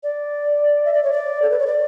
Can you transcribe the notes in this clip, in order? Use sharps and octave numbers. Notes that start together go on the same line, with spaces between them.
D5
E5
D5
C#5
D5
A4
B4
C#5
D5